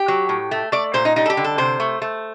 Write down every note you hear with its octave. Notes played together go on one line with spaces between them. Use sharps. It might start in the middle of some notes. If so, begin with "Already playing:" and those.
Already playing: G4
F#3
A2
A3
A3 D5
A#2 C5
D#4
G3 D#4
A4
G4
D3
A4
C3 C5
A3
A3